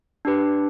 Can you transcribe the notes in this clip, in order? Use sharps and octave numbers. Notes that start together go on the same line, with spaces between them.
D4 G4 B4